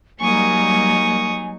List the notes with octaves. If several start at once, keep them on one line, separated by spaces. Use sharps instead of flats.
F#3 G3 A#3 D#4 G#5 C#6 D#6